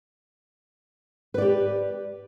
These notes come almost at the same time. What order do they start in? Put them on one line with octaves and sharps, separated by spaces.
B4 D5 G4